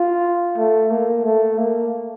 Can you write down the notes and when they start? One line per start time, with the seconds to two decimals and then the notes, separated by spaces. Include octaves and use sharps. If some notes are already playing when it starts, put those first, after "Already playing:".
Already playing: F4
0.58 A3
0.90 A#3
1.25 A3
1.58 A#3